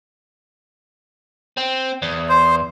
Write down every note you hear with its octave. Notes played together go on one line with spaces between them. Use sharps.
C4
E2
C5